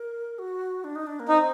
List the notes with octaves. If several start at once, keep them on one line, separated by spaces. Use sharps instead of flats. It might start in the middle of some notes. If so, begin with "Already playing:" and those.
Already playing: A#4
F#4
D4
D#4
D4
A#3
C4 D#4